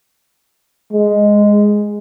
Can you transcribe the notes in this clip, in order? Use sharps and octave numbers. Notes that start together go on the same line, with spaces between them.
G#3